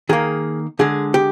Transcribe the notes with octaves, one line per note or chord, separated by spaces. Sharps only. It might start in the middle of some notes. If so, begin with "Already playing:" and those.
D#3 A#3 G#4
D3 G#3 G#4
G4